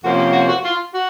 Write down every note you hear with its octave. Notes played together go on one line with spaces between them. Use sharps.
F2 C3 F3 A#3 C#4 F#4
G4
F#4
F#4
F4
F#4